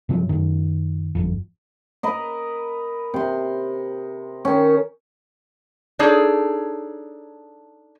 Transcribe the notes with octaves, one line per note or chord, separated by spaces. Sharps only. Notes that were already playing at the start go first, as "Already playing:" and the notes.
G2 C3 F3 F#3
F#2 D#3
G1 F2
A#4 B4 D#5
C3 C6
D#3 C#4
D4 D#4 G#4 A4 C#5